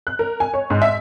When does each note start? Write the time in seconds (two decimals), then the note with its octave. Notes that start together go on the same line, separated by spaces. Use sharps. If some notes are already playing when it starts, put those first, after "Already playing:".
0.07 F#6
0.19 A#4
0.40 G#5
0.54 C#5
0.70 G#2
0.82 E5